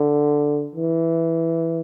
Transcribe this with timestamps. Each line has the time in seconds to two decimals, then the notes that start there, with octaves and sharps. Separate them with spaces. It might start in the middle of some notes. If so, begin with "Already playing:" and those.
Already playing: D3
0.76 E3